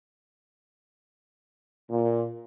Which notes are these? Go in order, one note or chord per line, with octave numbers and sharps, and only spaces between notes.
A#2